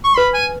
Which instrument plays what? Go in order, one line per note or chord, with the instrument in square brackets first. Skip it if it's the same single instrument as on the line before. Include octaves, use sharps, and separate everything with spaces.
[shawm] C#6
[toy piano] B4 [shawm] B5
[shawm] G#5